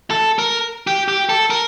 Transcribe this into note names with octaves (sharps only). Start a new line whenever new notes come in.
A4
A#4
G4
G4
A4
A#4